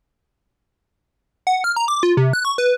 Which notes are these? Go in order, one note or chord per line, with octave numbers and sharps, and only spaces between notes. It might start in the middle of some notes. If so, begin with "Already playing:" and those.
F#5
F6
A#5
D6
F4
C3
F#6
C#6
B4